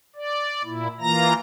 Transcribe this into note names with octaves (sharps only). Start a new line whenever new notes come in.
D5
A#2 E4
E3 A#3 F4 A#5 A#6